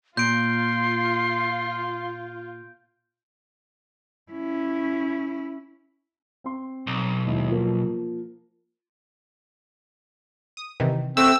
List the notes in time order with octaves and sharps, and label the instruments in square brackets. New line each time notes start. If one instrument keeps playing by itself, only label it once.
[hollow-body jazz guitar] A#2 [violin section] F4 [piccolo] C6 [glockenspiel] G6 D7
[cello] C#4 E4
[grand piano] C4 C6
[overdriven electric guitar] B1
[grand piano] D#2 G#3 E4
F3 A#3
[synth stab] D#6
C3 D#3 E3
[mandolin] A3 F#4 [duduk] C4 [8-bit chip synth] E6